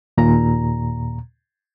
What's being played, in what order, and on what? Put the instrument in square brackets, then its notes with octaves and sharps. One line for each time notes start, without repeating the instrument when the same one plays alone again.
[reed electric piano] D#2 A#2 A#5